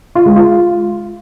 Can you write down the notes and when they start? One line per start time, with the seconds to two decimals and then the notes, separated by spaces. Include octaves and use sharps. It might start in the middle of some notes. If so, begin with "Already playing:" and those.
0.15 F4
0.26 G#3
0.36 F4